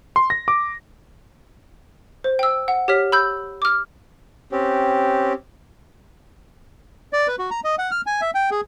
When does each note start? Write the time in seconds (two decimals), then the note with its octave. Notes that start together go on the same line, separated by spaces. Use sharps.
0.16 C6
0.30 A#6
0.48 D6
2.24 C5
2.39 G5 E6
2.68 F#5
2.88 G4 C#5 F6 B6
3.12 B5 E6 G6
3.62 D6 F6
4.52 C4 C#4 G4
7.13 D5
7.28 B4
7.39 F#4
7.51 A#5
7.64 D#5
7.78 F#5
7.91 F6
8.06 G#5
8.21 E5
8.34 G5
8.51 G#4